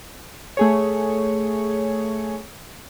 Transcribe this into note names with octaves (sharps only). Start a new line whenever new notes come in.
A3 G#4 C#5